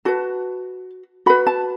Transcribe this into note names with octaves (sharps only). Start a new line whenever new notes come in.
F#4 B4 A5
F#4 B4 B5
A5